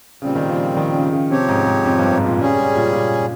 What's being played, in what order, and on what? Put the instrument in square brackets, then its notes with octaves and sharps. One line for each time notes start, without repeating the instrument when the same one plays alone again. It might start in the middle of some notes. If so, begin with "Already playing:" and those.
[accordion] A#2 G3 C4 [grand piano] C#3
[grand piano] D#3
F3
D#3
C#3
C#3
[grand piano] C3 [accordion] F3 C4 G4 C#5
[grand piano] G#2
G#2
F2
G2
G#2
A#2
[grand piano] C#3 [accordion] G3 C#4 G#4
[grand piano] G#3
A#2
A#2